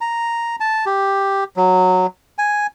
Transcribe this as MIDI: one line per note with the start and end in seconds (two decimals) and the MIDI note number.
0.01 0.56 82
0.60 0.85 81
0.86 1.44 67
1.57 2.06 54
2.38 2.67 80